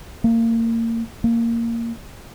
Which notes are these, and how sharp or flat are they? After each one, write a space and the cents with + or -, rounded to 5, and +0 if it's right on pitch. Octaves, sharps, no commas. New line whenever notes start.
A#3 -30
A#3 -10